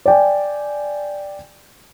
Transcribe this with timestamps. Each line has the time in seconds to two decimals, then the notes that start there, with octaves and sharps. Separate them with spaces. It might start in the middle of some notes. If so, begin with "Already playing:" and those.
0.06 D5 G5 G#5